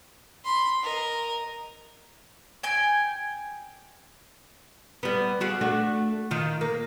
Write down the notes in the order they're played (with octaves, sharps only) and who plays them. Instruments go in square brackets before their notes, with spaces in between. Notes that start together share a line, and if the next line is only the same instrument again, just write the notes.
[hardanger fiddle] B5 C6
A#4 D#5
[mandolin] G5 G#5
[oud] G3 B3
G3 F#4 G#4
A3 D4 F#4
D#3 F4
A#3